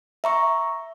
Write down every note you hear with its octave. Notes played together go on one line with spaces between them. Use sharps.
E5 A#5 C#6